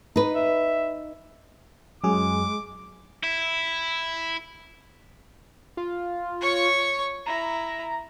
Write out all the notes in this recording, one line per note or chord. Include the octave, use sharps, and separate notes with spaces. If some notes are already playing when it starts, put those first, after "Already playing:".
D#4 B4
E5
F#2 F#3 G#3 G#4 D6
E4
F4
C#5 C#6
E4 A#5